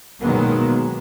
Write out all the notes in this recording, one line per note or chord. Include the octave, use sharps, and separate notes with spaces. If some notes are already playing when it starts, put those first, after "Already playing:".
B2 D#3 F#3 G#3 A#3 B3